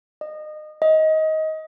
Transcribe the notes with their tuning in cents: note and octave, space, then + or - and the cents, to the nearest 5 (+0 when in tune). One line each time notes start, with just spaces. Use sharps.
D#5 -30
D#5 +20